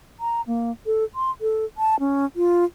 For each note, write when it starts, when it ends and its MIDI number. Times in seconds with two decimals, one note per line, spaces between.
0.20 0.41 82
0.47 0.71 58
0.86 1.04 69
1.15 1.31 84
1.41 1.65 69
1.78 1.99 81
2.00 2.25 61
2.36 2.64 65